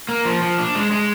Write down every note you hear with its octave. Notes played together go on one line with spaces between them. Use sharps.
A#3
F3
F3
D4
G#3
G#3